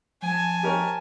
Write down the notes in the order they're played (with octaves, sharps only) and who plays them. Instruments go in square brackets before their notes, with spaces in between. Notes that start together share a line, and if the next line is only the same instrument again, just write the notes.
[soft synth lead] F3 [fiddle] G#5 A5
[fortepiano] G4 A#4 C#5